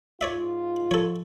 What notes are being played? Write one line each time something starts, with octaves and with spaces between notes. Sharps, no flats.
G#2 F4 C#5 D5 E5
F3 A4 C#5